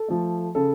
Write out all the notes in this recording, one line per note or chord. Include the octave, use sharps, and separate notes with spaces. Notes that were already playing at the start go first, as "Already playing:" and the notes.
Already playing: A4
F3 A3
C#3 A4